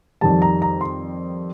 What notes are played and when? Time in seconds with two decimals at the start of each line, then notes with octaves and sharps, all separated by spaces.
0.21 F2 D#3 G3 A5
0.42 A#5
0.62 A#5
0.81 C6